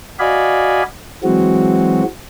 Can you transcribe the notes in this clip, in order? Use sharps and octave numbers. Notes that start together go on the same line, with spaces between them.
F#4 D5 D#5 F5 G#5 B5
E3 F#3 G#3 C4 F#4